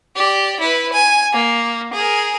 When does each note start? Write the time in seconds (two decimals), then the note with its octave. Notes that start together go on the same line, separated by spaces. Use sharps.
0.16 G4 D5
0.60 E4 B4
0.93 G#5
1.33 A#3
1.93 G#4 A#4